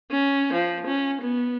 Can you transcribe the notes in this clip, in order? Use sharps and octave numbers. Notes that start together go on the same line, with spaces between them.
C#4
F3
C#4
B3